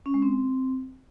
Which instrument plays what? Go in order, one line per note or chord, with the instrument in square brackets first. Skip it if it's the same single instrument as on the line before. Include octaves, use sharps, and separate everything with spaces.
[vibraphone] C#4
G#3
C4